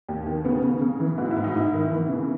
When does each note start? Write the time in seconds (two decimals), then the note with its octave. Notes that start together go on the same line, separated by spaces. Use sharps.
0.09 D#2
0.26 D#3
0.45 C#3 B3
0.63 C#3
0.81 C#3
1.00 E3
1.18 G#2 F#4
1.31 E4
1.37 G#2
1.44 D#4
1.55 G#2 E4
1.73 D#3
1.92 E3
2.09 C#3